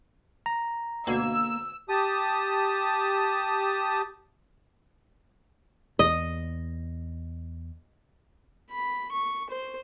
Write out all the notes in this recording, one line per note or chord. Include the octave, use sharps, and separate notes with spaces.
A#5
D2 B2 A#3 E6 G#6
G4 A5 D#6
E2 D#5
B5
C#6
C5